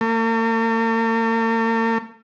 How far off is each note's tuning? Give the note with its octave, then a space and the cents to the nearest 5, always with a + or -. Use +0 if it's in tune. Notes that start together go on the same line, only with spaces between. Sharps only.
A#3 -45